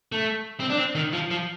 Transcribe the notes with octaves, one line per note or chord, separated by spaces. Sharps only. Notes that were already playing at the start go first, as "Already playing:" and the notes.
A3
C4
D4
C4
D#3
F3
F3